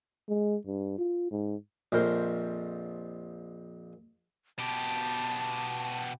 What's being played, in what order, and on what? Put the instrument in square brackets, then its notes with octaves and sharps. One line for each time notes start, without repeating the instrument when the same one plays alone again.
[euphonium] G#3
G2
F4
G#2
[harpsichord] A#1 F2 A#4 C5
[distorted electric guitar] B2 G4 [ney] A5